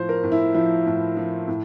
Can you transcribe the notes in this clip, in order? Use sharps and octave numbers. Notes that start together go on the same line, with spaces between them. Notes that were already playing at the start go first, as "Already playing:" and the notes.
Already playing: A2 F3 C5
A#4
A2
E4
F3 E4
A2
F3
A2